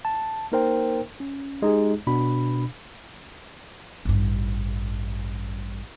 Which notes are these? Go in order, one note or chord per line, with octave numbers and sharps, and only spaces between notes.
A5
A#3 D#4 A#4 C5 G5
C#4
G#3 D#4 G4 G#4
B2 D4 B5
A1 G2